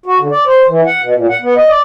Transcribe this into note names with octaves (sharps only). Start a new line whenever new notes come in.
F#4
D3
D5
C5
E3
F#5
B2
A#2
F#5
B3
D#5
D5